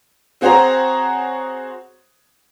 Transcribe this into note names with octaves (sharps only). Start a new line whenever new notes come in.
C4 F#4 G#4 C5 C#5 A#5